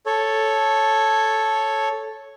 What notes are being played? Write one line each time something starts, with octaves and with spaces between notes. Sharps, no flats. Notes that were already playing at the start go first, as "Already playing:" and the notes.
A4 C#5